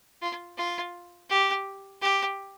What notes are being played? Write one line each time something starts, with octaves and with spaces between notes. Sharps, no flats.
F4
F4
G4
G4